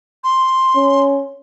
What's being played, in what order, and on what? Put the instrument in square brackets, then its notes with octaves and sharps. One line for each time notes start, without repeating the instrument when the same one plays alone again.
[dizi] C6
[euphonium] C#4